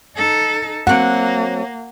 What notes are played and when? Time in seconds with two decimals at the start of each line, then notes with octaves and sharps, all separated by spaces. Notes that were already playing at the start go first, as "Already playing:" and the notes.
0.16 D#4 A4
0.87 F#3 A#3 C4 F#5